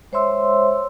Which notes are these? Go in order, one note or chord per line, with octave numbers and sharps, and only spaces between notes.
G#3 C5 C#5 E5 C6 E6